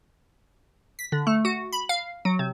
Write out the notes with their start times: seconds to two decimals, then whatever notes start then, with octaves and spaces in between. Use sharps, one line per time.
0.99 B6
1.12 D3
1.27 A3
1.45 F#4
1.73 B5
1.89 F5
2.25 F#3
2.39 C3